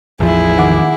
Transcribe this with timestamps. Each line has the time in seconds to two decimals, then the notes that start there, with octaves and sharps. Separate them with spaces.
0.20 A1 E2 F3 E4 G#4
0.58 D#3 F#5 D6